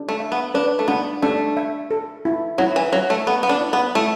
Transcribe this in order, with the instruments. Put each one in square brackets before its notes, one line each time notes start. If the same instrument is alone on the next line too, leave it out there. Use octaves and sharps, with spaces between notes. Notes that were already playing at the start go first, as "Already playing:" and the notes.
Already playing: [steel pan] D4
[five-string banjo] A3
[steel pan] E5
[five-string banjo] B3
[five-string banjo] D4 [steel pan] B4
[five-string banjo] A3
[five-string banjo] B3 [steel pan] D4
[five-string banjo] A3 [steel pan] D4
[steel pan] E5
A4
E4
[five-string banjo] F#3 [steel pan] E4
[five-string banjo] E3
[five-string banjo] F#3 [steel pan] F#5
[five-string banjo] A3
[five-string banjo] B3 [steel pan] A4
[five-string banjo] B3
D4
[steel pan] E4
[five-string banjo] B3
[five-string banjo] A3 [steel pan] E4